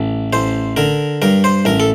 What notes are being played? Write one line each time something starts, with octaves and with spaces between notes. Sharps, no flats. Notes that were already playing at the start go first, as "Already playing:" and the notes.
Already playing: A1
A1 C5
D3 A#4
G2 A#4
C5
A1 A#4
A4